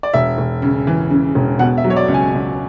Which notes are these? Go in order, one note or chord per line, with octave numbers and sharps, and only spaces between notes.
D5
E1 E5
E1
C#3
E3
C#3
E1
B2 F#5
E5
F#3
C#5
D5
C#2
G#5
C#2